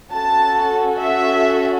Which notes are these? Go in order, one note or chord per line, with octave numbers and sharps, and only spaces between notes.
C#4 F#4 A4 A5
E5